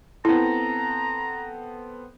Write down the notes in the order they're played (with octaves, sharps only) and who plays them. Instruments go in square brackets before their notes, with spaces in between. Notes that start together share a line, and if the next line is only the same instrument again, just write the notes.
[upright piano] B3 C4 A4 [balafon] E4 [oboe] A#5